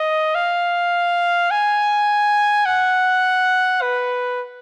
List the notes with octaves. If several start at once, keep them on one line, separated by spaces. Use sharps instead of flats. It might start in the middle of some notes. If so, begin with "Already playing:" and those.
Already playing: D#5
F5
G#5
F#5
B4